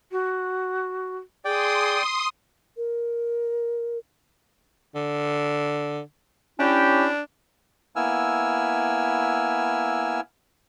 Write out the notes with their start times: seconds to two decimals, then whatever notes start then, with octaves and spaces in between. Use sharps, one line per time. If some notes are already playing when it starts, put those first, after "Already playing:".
0.12 F#4
1.45 G#4 D5 G5 C6 D#6
2.77 A#4
4.95 D3
6.59 C#4 D4 E4 G4
7.96 A#3 B3 E4 G#5 E6 F6